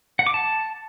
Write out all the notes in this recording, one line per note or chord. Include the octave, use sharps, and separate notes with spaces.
F#5
D6
A5